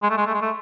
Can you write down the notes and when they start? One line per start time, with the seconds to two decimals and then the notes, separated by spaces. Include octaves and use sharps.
0.03 G#3
0.10 A3
0.17 G#3
0.26 A3
0.34 G#3
0.42 A3